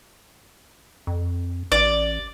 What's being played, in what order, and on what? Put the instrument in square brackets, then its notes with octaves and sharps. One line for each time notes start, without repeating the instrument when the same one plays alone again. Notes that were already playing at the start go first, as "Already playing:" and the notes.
[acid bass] F2
[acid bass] A1 [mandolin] D5